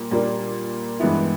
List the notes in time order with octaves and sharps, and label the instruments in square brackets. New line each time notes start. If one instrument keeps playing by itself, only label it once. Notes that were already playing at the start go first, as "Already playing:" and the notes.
Already playing: [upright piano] A#2 G3
A#2 G3 A#3 D4
G2 E3 G#3 B3 E4